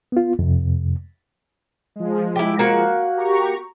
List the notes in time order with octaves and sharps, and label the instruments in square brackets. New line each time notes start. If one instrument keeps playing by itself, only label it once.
[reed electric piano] B3 F4
F2 C3
[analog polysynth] F3 G#3
[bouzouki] E4 G4
A#3 F#4 F#5
[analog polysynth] G4 A#5 C#6